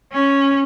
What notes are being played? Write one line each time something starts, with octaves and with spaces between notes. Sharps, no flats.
C#4